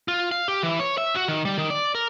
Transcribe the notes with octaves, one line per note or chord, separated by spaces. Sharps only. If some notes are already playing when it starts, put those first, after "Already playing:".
F4
F5
G4
E3
C#5
E5
F#4
D#3
G3
D#3
D5
A#4